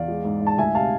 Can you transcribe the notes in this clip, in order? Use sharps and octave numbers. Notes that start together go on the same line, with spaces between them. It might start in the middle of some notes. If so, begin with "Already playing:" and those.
Already playing: E2 D5 F5
G#3
G#2
G#2
A5
D2 E5 G#5
C3 F5 A5